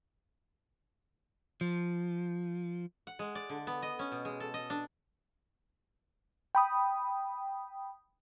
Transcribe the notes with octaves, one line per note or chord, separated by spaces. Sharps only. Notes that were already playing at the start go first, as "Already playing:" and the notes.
F3
F#5
G#3
D5
D3
B3
D#5
C#4
B2
G#3
A4
D#5
D4
G5 B5 D#6